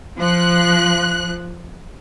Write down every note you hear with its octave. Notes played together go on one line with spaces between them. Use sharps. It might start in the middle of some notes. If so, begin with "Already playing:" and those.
F3 F#6